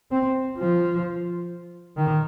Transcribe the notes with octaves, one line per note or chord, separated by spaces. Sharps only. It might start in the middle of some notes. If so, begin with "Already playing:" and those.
C4
F3
D#3